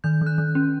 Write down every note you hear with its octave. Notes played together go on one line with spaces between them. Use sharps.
D#3 G6
D#3
F#6
D#3
C#4